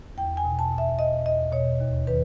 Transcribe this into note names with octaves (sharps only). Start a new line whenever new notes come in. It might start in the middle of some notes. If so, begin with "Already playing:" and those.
E2 G5
G#5
B2
A5
B2
E5
B2 D#5
E2 D#5
B2 C#5
D#2
D#3 B4